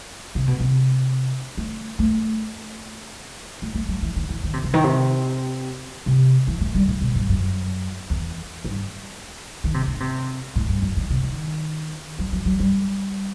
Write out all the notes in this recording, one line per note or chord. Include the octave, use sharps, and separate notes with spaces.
C3
B2
C3
A3
A3
A3
A3
F#3
E3
D#3
E3
D#3
C3
C3
D#3
C3
C3
E3
A3
G3
A2
B2
G2
F#2
E2
G2
D#3
C3
D#3
C3
A2
G2
F#2
D#3
C3
D#3
F#3
F#3
F#3
G3